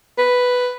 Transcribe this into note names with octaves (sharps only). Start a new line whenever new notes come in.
B4